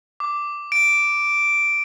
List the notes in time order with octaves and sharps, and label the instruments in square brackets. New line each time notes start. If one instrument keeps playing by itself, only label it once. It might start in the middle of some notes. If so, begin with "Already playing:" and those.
[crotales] D6
D7